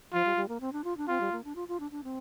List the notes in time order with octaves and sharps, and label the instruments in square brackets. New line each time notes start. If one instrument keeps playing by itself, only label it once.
[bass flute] F3 [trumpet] F4
[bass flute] G3
G3
A#3
C4
D4
F4
D4
[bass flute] C4 [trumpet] F4
[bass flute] G3
A#3
D4
F4
F4
D4
D4
C4